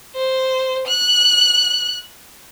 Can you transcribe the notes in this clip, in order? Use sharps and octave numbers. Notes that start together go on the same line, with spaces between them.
C5
F#6